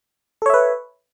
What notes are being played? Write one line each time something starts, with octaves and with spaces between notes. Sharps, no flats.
A4 B4 C#5 E5